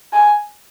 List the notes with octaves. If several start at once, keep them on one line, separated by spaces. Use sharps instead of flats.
G#5